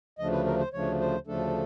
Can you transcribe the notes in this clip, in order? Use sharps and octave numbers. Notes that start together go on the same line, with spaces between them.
D2 C#3 F3 A3 D4 D#5
B4
A#4
C5
D2 C#3 F3 A3 D4 C#5
C5
D2 C#3 F3 A3 D4 A4